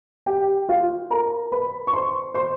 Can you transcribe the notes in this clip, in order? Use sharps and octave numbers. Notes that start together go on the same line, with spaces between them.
G4 G5
F4 F5
A#4 A#5
B4 B5
C#6
C5 C6
C5 C6